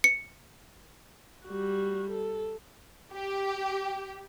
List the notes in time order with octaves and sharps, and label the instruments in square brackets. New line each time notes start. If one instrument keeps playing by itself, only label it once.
[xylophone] C#7
[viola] G3 F#4
A4
[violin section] G4